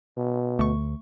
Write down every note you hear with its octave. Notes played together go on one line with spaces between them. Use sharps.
B2
D2 A3 C#6